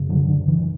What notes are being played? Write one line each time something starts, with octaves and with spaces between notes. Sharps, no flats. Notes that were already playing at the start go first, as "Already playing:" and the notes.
Already playing: F#2 C#3
D3 F#3
D3
E3